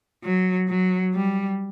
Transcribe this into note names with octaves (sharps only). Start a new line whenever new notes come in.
F#3
F#3
G3